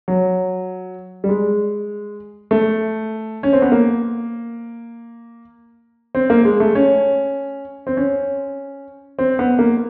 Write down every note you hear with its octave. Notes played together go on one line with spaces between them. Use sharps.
F#3
G3
G#3
A3
C#4
C4
B3
A#3
C4
A#3
G#3
A3
C#4
C4
C#4
C4
B3
A#3